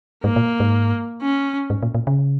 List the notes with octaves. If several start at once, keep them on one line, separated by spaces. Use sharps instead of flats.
G#2 A#3
A#2
G#2
C#4
G#2
A#2
A#2
C#3